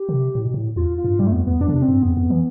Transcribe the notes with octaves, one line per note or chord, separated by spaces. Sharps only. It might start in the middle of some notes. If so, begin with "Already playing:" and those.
Already playing: G4
D3
C3
A2
B2
A2
E2 F4
F4
G2
G2 G3
A3
F2 B3
E2 B3
F2 D4
D3
C3 D4
C4
G2
F2 B3
F2
E3